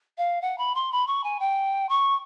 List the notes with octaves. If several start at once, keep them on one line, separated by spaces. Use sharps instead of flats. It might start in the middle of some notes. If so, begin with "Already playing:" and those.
F5
F#5
B5
C6
B5
C#6
G#5
G5
C#6